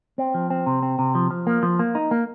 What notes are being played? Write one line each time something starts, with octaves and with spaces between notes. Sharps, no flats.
C4
F3
C4
C3
C4
C3
F3
F3
A#3
F3
A#3
D#4
A#3